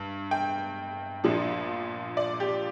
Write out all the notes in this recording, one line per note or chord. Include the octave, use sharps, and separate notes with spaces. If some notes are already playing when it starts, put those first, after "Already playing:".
Already playing: G2
G5
A#1 A#2 F3 D4
D5
G4